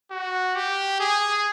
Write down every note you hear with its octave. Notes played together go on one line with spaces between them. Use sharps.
F#4
G4
G#4